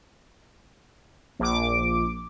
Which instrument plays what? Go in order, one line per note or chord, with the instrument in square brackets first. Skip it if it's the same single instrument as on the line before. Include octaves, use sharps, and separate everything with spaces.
[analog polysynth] A#1 D6